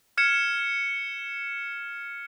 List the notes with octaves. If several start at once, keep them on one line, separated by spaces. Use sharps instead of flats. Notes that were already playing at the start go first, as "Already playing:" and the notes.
F6 G#6 C#7 E7